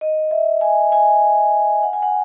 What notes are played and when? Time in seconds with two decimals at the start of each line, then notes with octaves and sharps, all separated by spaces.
0.01 D#5
0.31 E5
0.61 G#5
0.92 G#5
1.83 F#5
1.93 G#5
2.02 F#5